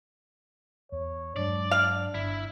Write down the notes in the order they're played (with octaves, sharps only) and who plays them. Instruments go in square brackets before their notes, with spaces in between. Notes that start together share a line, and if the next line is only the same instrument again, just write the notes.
[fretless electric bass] E2 [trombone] C#5
[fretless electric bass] G2 F#3 G#3 [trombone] D4 [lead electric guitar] D5
[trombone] D4 [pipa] F5
[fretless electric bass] G1 [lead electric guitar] E4